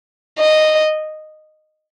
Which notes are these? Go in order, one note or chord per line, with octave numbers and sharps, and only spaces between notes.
D#5